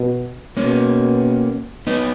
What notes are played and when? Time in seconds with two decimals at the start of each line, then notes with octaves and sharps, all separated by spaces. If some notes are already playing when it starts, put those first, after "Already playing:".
Already playing: B2
0.57 B2 A#3 C#4
1.87 B3 D#4